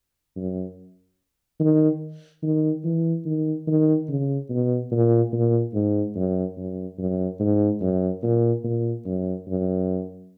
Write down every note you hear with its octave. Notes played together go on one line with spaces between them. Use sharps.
F#2
D#3
D#3
E3
D#3
D#3
C#3
B2
A#2
A#2
G#2
F#2
F#2
F#2
G#2
F#2
A#2
A#2
F#2
F#2